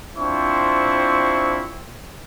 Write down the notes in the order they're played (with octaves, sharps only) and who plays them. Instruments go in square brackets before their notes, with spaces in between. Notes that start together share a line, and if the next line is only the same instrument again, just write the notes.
[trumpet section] C4 D4 E4 F4 C5 C#6